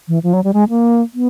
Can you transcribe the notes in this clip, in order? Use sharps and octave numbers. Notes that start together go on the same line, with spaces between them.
E3
F3
F#3
G3
G#3
A#3
B3